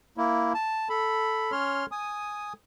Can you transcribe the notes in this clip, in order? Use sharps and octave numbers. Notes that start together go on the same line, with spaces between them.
A#3 E4
A5
A4 B5
C#4 C#5 C6 F6
G#5 D#6